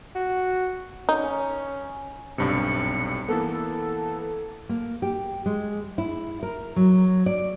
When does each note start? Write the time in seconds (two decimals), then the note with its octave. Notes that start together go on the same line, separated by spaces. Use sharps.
0.15 F#4
1.09 C#4 D#4
2.38 B1 G2 C3 C#7
3.29 E3 A#3 B3 A4
4.69 A#3
5.02 G4
5.46 G#3
5.98 E4
6.43 A#4
6.76 F#3
7.26 D5